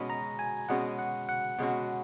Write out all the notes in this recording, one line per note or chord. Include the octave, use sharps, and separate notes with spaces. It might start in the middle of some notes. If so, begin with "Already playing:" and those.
Already playing: B2 G#3 C#4 F#4 B5
A#5
G#5
B2 G#3 C#4 F#4 F#5
F#5
F#5
B2 G#3 C#4 F#4